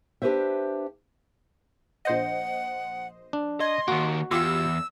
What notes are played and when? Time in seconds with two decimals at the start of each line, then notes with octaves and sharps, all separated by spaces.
0.22 D4 G4 G#4 B4 C5 E5
2.05 A#1 C5 D#5 F#5
3.33 D4
3.60 D#5 C6 G#6
3.88 D#3 A#3 F#4
4.31 E2 F4 G4 E6 C#7